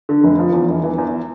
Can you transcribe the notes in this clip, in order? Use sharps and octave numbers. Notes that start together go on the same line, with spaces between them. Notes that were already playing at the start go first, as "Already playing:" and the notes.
D3
F1
F3
E2
E1
E3
E2